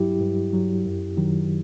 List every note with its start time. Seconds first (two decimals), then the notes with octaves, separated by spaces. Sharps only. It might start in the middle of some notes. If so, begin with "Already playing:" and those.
Already playing: G2 F#3 E4 G4
0.21 G2
0.53 F#3
0.85 F#2
1.17 D#3 F#3